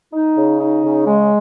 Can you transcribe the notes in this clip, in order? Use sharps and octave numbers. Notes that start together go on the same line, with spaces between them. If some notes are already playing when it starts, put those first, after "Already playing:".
D#4
C#3
D#4
C#3
G#3